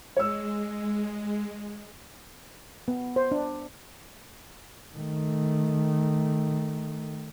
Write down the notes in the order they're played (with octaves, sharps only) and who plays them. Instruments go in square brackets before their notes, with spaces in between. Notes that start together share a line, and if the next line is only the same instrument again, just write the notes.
[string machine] G#3 [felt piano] C#5 E6
[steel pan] B3
C5
D4
[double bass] D#3 A3